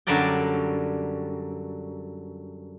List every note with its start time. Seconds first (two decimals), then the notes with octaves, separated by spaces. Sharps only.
0.07 F#2 D3 G3 A#4 D5 G5